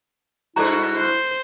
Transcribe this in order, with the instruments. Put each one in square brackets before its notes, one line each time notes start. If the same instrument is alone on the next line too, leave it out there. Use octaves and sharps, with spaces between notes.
[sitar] G2 B2 F#4 [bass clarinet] E4 [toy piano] A4 D5 A#5
[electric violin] C5